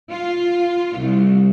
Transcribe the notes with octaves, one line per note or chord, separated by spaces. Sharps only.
F4
C2